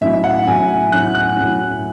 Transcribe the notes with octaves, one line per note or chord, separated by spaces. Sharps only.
A2 F#3 C#4 E4 E5
F#5
A2 F#3 C#4 E4 G#5
A2 F#3 C#4 E4 F#6
F#6
A2 F#3 C#4 E4